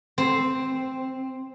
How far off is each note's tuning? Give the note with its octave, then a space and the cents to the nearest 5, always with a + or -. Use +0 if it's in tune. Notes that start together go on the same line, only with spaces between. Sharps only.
C4 +0 C5 +0